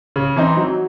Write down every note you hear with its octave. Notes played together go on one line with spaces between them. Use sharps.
C#3
E3 C4 D#4
F#3